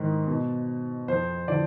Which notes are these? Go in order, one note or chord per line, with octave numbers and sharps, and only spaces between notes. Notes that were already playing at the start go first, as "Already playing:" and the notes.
Already playing: G#2 D#3
B2
F2 C5
D3 F3 D5